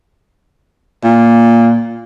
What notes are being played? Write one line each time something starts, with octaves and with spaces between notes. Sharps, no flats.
A#2